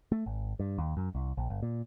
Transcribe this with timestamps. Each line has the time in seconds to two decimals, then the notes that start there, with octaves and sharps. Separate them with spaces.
0.12 A3
0.26 G#1
0.59 G2
0.78 D#2
0.97 F#2
1.15 C2
1.37 A#1
1.50 G1
1.62 A#2